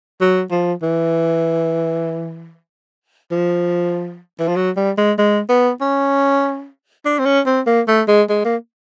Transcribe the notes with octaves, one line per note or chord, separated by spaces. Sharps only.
F#3
F3
E3
F3
E3
F3
F#3
G3
G#3
G#3
B3
C#4
D4
C4
C#4
C4
A#3
A3
G#3
G#3
A#3